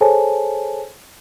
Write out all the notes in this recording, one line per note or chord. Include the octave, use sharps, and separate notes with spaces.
G#4 A4 C5 C#5 G#5 A5